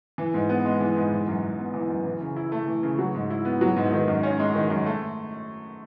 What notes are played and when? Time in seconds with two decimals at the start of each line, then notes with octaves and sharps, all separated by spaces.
0.18 E3
0.34 G#2
0.49 B3
0.65 G#3
0.80 E3
0.96 G#2
1.12 E3
1.27 F#2
1.43 F#2
1.59 B3
1.74 E3
1.90 F#2
2.05 E3
2.21 C#3
2.37 E4
2.52 A3
2.67 E3
2.83 C#3
2.99 F#3
3.15 G#2
3.30 E4
3.45 B3
3.61 F#3
3.76 G#2
3.92 D#3
4.08 F#2
4.23 C#4
4.39 G#3
4.55 D#3
4.70 F#2
4.86 A3